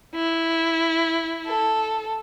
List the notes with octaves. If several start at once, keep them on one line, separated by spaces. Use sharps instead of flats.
E4
A4